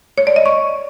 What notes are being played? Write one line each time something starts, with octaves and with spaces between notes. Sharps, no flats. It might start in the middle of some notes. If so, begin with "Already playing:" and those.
C#5
D5
D#5
C#6